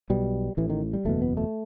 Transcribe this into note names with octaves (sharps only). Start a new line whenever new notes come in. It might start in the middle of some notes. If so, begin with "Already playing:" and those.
B1 B2 G3
A1 A2 E3
D#3
G3
F#1 E2 B2 A3
B3
A3